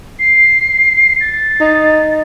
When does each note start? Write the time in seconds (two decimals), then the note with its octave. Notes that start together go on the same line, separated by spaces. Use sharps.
0.19 C7
1.21 A6
1.61 D#4